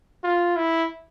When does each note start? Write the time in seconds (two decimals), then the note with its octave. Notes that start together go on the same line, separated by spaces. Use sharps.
0.24 F4
0.56 E4